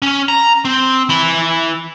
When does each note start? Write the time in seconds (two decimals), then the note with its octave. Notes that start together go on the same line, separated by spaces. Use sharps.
0.02 C#4
0.28 A#5
0.65 C4
1.09 E3 B5